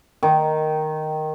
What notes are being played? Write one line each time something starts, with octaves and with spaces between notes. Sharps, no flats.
D#3